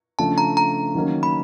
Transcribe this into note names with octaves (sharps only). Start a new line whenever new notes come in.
C#3 F3 A3 D4 A5
A#5
A#5
D#3 F#3 A#3 C#4
B5